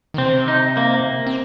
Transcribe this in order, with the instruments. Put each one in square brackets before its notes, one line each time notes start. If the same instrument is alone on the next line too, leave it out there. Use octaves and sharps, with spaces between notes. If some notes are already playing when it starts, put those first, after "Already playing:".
[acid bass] D#3
[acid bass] C3 [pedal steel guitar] C4
[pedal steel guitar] D#4
A#3
[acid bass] C4